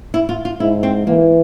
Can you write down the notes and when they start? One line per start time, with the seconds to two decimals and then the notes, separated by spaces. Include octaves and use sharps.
0.14 E4
0.29 F4
0.45 F4
0.60 G#2 E4
0.83 C4
1.07 E3 A#3